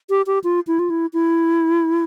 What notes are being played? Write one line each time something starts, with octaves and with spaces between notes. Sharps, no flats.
G4
G4
F4
E4
F4
E4
E4